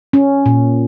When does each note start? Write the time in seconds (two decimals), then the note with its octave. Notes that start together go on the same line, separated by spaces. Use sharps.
0.13 C#4
0.46 A#2